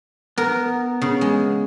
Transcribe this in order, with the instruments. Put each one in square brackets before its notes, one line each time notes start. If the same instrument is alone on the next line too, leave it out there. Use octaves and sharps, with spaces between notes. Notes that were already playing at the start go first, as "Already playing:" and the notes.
[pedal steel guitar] B3 [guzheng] A#4
[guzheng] C#3
G#3